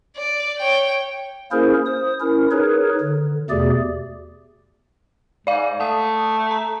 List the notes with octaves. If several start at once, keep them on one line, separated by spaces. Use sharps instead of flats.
D5
C#5 G5
A#3 C#4 E4 G#4 A#4 C5
C5 D#6
C#4 E4 A#4
D#4 G#4 A#4 B4 C#5
D3
E2 B2 A3 G4 G#4 D5
G#2 D5 F5
A3 F#5 D#6
A#5